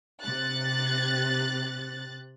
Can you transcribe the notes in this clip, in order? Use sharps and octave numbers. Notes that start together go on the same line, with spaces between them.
C3 F#6 A6